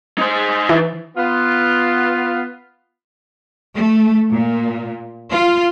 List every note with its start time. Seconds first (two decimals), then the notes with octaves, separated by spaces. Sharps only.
0.18 D#4 C5
0.69 E3
1.17 B3 F4
3.74 A3
4.31 A#2
5.30 F4